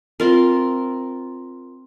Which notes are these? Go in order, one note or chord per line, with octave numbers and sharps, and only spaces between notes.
C4 F4 A#4